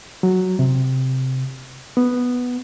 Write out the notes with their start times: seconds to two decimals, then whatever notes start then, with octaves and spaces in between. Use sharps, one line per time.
0.23 F#3
0.59 C3
1.97 B3